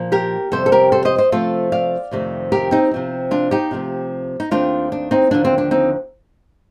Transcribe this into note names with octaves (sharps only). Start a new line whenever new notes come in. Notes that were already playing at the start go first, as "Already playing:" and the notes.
Already playing: A#2 F3 A#3
G4 A#4
F2 C3 G3 A4 C5
A4
G4 A#4
A4 C5
C5 D#5
C5 D#5
C3 F3 A3 C4 F4 A4
D5 F5
F2 C3 D#3 A3
G4 A#4
C4 D#4
C3 F3 C4
D4 F4
D#4 G4
C3 F3 A3 C4
D#4
D#2 D#3 A3 C4 D4 F4
D4
C4 D#4
D#2 D3 F3 A#3 D4
C4
D4
C4 D#4